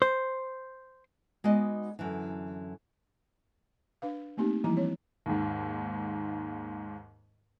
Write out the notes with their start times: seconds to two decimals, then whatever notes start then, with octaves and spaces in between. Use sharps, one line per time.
0.02 C5
1.44 G#3 B3 D#4 F#4 D5 D#5
1.99 F#2 D3 E3
4.02 D4 B4 F5
4.37 A3 A#3 C4 D#4 G4
4.64 E3 F3 G3 A#3 E4 A#5
4.76 C4 C#5
5.26 D#2 G#2